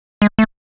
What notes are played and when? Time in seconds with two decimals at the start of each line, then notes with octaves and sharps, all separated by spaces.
0.22 G#3
0.39 A3